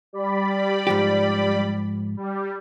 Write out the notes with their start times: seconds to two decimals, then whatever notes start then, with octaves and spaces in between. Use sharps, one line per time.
0.13 G3 D5 B5
0.87 G#2 F3 G4
2.17 G3